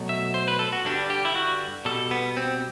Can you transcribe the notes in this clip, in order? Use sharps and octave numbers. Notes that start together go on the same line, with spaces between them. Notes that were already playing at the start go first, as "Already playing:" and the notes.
Already playing: B2 F#3 A3
E5
C5
B4
A4
F#4
G2 D3 G3 D4
G4
E4
F#4
B2 G3 A4
B3
C4